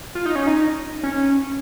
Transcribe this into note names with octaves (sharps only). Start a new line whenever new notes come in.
F4
D#4
C#4
D#4
C#4